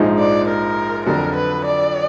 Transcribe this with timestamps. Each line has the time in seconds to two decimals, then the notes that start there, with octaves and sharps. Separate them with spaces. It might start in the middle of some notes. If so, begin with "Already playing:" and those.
Already playing: A#1 G#2 F3 G#3 D#4
0.18 D5
0.48 A#4
1.06 F2 D3 F#3 A#4
1.36 B4
1.65 D5